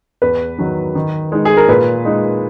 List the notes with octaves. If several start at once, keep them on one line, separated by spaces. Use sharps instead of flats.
E2 B4
D#3 F#3
D#3
G#3 D#4
G#4
A#4
A#2 B4
G#3 D#4